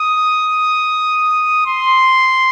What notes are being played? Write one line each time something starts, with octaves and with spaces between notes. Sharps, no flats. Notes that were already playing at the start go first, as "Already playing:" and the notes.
Already playing: D#6
C6